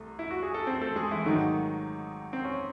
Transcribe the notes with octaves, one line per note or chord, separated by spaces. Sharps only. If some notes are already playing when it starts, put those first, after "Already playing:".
Already playing: C2 A3
E4
F#4
G#4
A4
C4 C5
A3 A4
G#3 G#4
E3 E4
G#1 G#2 D#3 F#3 A3 D#4
C4
C#4